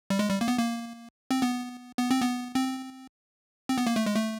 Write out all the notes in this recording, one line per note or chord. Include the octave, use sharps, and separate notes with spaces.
G3
G#3
G3
A#3
B3
A#3
C4
B3
B3
C4
B3
C4
C4
B3
A#3
A3
G#3
A3